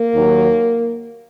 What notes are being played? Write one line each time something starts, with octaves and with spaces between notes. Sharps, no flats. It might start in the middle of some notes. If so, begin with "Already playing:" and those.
Already playing: A#3
D#2 D#3 F#3